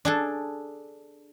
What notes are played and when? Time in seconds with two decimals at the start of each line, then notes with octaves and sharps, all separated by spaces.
0.05 D4 G#4 A4